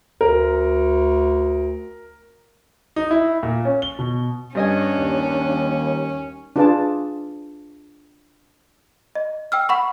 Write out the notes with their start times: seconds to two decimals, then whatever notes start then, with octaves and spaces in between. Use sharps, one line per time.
0.21 D2 A#4
2.96 D#4
3.11 E4
3.43 A#2
3.65 C#4
3.82 G7
3.99 B2
4.55 G2 C#4 D4 D#5 G#5
4.98 D#2
6.56 D4 F4 G#4 B4 F5 A5
9.15 D#5
9.52 G5 E6 F6
9.69 F#5 B5 C#6